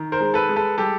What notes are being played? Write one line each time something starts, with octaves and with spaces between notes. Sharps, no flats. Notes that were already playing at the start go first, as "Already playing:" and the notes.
Already playing: D#3
A#4 C5
G#3
A4 B4
G#3
A4 B4
G3 G4 A4